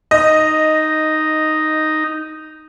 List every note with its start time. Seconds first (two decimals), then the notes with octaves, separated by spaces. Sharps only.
0.11 D#4 D#5